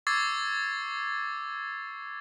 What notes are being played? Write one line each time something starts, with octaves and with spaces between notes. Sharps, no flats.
C#6 D6 E6 G#6 A6 C7